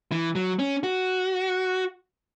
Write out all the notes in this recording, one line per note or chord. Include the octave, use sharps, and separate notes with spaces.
E3
F#3
C#4
F#4